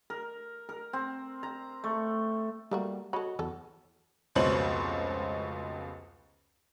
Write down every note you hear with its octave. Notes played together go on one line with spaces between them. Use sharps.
A#4
A#4
C4
A#5
A3
G3 A3 A#3 F#4
F#4 A4 C#5 D#5 B5
E2 F#3 A4
F1 C#2 B2 C5 C#5 F#7